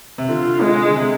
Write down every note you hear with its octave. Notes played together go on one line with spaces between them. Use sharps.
C3
D3 F4
G#3
D3
C3